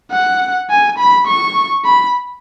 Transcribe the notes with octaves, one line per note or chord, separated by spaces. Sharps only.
F#5
G#5
B5
C#6
B5